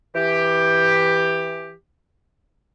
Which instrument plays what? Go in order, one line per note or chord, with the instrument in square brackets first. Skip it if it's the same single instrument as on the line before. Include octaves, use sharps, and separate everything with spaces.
[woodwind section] E3 G4